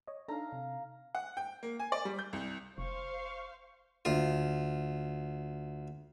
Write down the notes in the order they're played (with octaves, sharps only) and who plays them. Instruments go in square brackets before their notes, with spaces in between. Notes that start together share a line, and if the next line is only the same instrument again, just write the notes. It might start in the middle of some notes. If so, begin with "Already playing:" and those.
[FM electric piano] C#5 D#5
[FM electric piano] D4 D#4 A4 [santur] F5 A#5
[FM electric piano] C3
[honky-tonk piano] F#5
G5
A#3
G#5
D5
G3
G6
C2
[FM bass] F1 [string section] C5 F5 [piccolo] C#6
[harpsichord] D2 F4